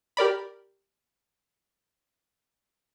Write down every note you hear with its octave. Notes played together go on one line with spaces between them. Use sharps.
G4 A#4 D5 B5